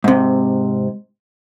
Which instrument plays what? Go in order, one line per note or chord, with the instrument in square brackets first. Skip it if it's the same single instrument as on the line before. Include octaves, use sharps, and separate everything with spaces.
[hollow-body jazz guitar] G#2 C3